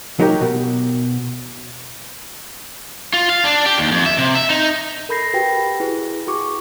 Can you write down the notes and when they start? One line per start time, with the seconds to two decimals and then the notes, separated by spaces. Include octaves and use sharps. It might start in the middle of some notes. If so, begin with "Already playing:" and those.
0.20 F#3 D#4 G4 A#4
0.41 B2
3.13 F4
3.30 F5
3.45 D4
3.66 G4
3.79 D#2
3.92 F2
4.06 E5
4.18 C3
4.36 E5
4.50 D#4
5.09 A4 A#4 B5 G6 A#6 C7
5.34 F#4 G4 B4 G5 A#6
5.80 E4 G#4 B4
6.27 F#4 G#4 C#6 D6